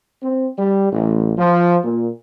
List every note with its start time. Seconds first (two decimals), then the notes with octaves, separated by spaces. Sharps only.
0.23 C4
0.58 G3
0.92 A1
1.37 F3
1.84 A#2